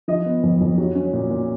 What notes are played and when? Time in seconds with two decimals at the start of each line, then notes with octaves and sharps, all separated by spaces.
0.08 F3 D#5
0.26 B3
0.43 F2
0.61 F2
0.78 F#3
0.95 C#4
1.13 A#2
1.30 A#2